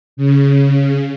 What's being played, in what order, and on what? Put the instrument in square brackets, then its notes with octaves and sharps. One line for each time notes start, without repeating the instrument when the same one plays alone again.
[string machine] C#3